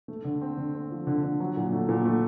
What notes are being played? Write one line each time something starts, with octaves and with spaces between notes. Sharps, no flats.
A3
D3
C4
D3
C4
F3
D3
D3
F#3
A#2
A3
A#2
A3